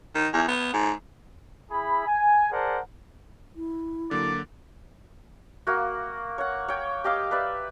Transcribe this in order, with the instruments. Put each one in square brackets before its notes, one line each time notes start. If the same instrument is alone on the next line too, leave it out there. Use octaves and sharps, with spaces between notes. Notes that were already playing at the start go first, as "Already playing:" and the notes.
[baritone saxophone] D#3
E2
B3
G#2
[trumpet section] E4 G#4 E5 B5
G#5
G#4 A#4 C5 D5 F#5 A5
[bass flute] E4
[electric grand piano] D3 F#3 A#3 [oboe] D5
[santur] A#3 F#4
C#5 F#5
C#5 G5
G4 D#5 F5 D6
B4 D5 E5